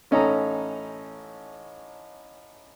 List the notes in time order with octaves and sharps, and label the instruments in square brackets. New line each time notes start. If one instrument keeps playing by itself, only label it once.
[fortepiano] A1 C#4 D#4 A4 A#5